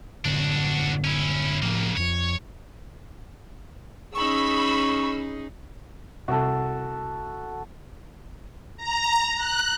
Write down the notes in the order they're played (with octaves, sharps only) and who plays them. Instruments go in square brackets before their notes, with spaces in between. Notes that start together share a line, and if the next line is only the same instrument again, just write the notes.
[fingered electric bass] F#1 A2 D3 [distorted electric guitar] D4 F#4
[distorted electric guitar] C#4 E4
[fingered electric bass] A2 F3 [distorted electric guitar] C#3 A#3
[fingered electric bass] F2 F3 [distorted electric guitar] C#5
[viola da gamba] C#4 D#4 G#4 [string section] B5 E6 [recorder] C#6
[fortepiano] C2 [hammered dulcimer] F#4 A4
[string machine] A#5
F#6